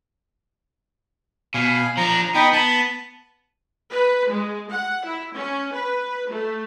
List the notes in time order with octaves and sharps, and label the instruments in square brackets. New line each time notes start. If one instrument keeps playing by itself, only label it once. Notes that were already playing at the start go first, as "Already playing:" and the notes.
[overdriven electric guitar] B2 [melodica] F5 G#5
[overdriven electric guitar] F3 D4 [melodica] A#5
[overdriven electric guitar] B3 [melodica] D#4 G5 B5
[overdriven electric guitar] B3 [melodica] A5
[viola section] B4
G#3
F#5
E4
C#4
B4
A3